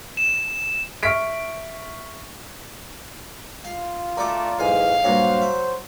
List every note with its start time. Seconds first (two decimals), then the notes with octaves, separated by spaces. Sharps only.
0.17 E7
1.03 E5 C#6 F6 B6 D7
3.65 F4 F5
4.18 A3 F#4 D5 A#5 D6
4.59 B1 E2 G#2 F5 G#5
5.04 G2 A#2 F#3 C5 C#5
5.42 E5